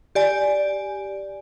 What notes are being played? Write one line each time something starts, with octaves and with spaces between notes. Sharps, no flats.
G4 D5 G#5